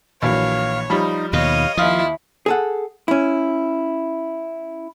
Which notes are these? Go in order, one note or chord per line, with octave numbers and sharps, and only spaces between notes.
A#1 E3 F#3 C#5 F5
F3 G3 D#4 B5
D#2 B2 D#3 C#5 D#5 F5
D#2 F3 E4 F4 F5 D#6
G#4 A4 F#5
C#4 E4